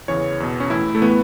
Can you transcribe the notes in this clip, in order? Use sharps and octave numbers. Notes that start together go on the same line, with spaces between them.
E2 C#3 E3 C#5
E2 B2
C#4
A2 E3 E4
A3
A2 E3 B3